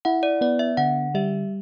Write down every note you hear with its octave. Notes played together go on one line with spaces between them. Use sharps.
E4 F#5
D5
B3 D5
E5
D3 F#5
G3 E5